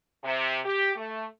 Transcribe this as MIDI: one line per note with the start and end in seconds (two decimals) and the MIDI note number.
0.23 0.58 48
0.64 0.91 67
0.96 1.24 57